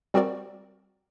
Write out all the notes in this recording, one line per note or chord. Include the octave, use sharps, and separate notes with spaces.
G3 C4 F#4 A#4 D5